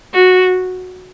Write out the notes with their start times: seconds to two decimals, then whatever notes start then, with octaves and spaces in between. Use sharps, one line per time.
0.14 F#4